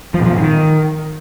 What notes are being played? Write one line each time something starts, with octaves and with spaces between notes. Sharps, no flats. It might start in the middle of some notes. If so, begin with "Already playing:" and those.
F3
A#2
F3
G#2
D#3